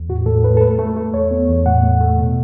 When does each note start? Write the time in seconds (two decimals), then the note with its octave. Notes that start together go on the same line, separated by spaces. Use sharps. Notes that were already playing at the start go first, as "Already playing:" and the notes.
Already playing: E2
0.09 A2 F#4
0.26 A2 A4
0.44 A2 B4
0.57 A4
0.61 A3 B4
0.79 A3 A4
0.97 A3
1.13 E2 C#5
1.31 B3
1.49 E2
1.66 A2 F#5
1.84 A3
2.01 A3
2.18 B2